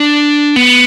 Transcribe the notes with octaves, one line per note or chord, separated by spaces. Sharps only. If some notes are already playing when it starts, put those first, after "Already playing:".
Already playing: D4
B3